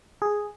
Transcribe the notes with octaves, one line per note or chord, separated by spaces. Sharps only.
G#4